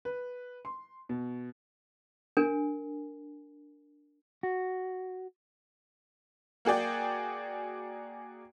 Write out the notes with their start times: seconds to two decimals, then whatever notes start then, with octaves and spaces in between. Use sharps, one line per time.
0.05 B4
0.65 C6
1.09 B2
2.37 D4 A#4 G#5
4.43 F#4
6.65 A#3 F#4 G#4 D5 G5